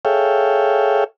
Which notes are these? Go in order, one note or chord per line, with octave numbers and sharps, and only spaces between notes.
G#4 A4 C#5 E5 F5 G5